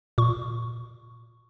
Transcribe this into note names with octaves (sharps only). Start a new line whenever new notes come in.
A#2 C#6